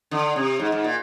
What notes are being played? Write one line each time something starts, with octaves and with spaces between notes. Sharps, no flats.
D3
C3
G#2
G#2
A#2